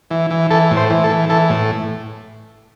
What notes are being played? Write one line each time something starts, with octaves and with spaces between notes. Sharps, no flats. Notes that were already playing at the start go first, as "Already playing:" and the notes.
E3
E3
E3 A4
A2
C5
E3
A4
E3
E3 A4
A2